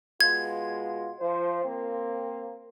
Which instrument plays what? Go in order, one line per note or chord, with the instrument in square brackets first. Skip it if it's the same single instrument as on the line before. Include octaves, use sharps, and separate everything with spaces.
[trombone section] B2 G#3 F4 [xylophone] G#6
[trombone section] F3 C5
A#3 C4